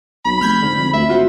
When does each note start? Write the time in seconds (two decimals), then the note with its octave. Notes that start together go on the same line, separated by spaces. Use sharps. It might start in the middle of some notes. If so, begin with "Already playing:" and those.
0.25 B1 B5
0.41 F1 F6 G6 G#6
0.62 G#2 D3
0.77 F2
0.93 D2 E5
1.09 G#1 F4 F#4 C5